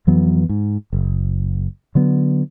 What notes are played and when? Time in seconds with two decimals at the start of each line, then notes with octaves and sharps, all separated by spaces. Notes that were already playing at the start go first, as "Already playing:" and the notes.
0.07 F2 E3 F#3 B3
0.49 G#2
0.93 F#1
1.95 D3 F#3 B3